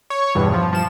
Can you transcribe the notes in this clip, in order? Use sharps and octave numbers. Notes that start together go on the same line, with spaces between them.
C#5
E2 G2 B2
F3
F3 E7